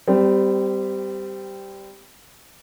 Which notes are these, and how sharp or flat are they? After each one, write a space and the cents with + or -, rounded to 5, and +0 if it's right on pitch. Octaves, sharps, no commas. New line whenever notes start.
G3 +0 C4 -30 G4 +0